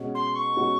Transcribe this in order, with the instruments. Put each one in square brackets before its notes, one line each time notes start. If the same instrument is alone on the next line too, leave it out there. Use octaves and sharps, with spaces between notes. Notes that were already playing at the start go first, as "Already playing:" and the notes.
Already playing: [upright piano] B2 G#3 C#4 F#4
[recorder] C6
C#6
[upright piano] B2 G#3 C#4 F#4